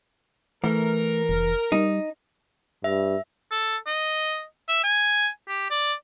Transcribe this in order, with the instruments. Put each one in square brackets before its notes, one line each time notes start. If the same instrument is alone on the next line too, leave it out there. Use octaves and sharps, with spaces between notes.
[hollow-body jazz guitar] E3 [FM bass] A3 [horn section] A#4
[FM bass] F1
[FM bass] G3 [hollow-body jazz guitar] D#4
[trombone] G2 [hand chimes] E5
[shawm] A4
D#5
E5
G#5
G4
D5